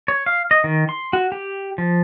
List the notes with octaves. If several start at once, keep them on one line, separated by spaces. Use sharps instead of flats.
C#5
F5
D#5
D#3
C6
F#4
G4
F3